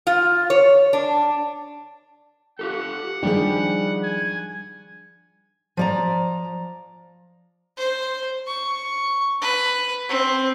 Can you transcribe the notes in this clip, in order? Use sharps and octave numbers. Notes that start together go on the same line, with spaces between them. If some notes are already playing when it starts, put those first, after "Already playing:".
F4
C#5
D4
F4 G4 A4 F#5
D#3 F3 G3 D4 G#4 D5
G#5
F3 D5 A#5
C5
C#6
B4
C4